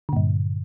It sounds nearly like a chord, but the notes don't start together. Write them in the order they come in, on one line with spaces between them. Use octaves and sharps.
D3 A#2 G2